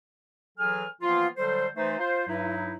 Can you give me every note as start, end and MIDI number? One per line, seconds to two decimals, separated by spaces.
0.58 0.84 52
0.58 0.84 54
0.58 0.84 68
0.58 0.84 69
0.58 0.84 80
0.58 0.84 89
1.01 1.27 52
1.01 1.27 53
1.01 1.27 58
1.01 1.27 59
1.01 1.27 65
1.37 1.67 50
1.37 1.67 54
1.37 1.67 55
1.37 1.67 69
1.37 1.67 72
1.76 1.97 52
1.76 1.97 57
1.76 1.97 63
1.76 1.97 72
1.99 2.26 65
1.99 2.26 72
2.27 2.74 43
2.27 2.74 54
2.27 2.74 63
2.27 2.74 64